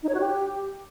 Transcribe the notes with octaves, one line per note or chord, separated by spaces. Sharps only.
D#4
C#5
F#4
G4